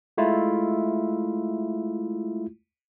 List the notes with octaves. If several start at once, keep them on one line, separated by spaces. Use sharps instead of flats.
G#3 A3 E4 F4